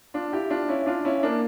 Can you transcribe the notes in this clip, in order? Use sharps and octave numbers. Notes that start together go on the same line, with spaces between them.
D4 F4
E4 G4
D4 F4
C#4 E4
D4 F4
C#4 E4
A#3 D4